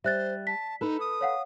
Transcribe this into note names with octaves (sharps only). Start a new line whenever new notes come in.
G3 C5 E5 F#6 A6
A5 B6
D#4 A4 B4
D#6
C#5 F5 F#5